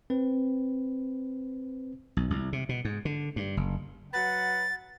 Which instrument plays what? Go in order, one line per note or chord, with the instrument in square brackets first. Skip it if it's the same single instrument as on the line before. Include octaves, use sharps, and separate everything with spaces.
[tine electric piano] C4 B4
[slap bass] B1
C2
C3
B2
G#2
D3
G2
F#1
[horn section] F#3 B4 F#5 [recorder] A6